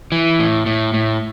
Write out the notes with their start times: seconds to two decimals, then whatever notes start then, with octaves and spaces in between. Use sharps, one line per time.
0.12 E3
0.39 A2
0.66 A2
0.94 A2